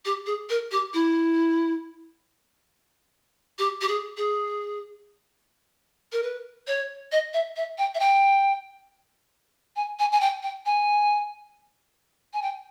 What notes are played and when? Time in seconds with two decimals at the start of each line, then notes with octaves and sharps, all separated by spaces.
0.05 G4
0.26 G#4
0.49 A#4
0.71 G4
0.93 E4
3.58 G4
3.81 G4
3.88 G#4
4.17 G#4
6.12 A#4
6.22 B4
6.67 C#5
7.12 D#5
7.33 E5
7.56 E5
7.78 G5
7.94 E5
7.99 G5
9.76 G#5
9.99 G#5
10.12 G#5
10.20 G5
10.42 G5
10.65 G#5
12.33 G#5
12.42 G5